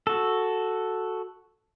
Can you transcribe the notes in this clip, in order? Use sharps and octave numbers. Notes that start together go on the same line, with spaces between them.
F#4 A4